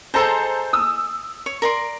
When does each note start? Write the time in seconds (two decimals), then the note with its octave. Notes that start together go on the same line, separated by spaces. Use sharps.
0.14 G#4 A4 C5 D#5 A5 A#5
0.73 D#6 E6
1.46 C#5
1.62 A#4 D5 C6